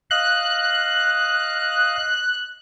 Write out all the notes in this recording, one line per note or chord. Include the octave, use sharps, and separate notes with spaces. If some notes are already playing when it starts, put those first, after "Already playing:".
D#5 F5 F#6